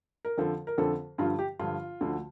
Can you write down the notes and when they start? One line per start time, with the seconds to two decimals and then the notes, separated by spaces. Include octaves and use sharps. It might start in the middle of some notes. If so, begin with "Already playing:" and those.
0.25 A#4
0.38 F2 D3 F3 A4
0.67 A#4
0.78 F2 D3 F3 A4
1.18 G2 D3 F3 F4
1.39 G4
1.59 G2 D3 F3 F4
2.01 D2 D3 F3